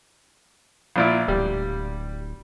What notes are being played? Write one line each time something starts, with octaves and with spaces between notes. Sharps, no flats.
A#1 A#2 F3 E4
D1 G3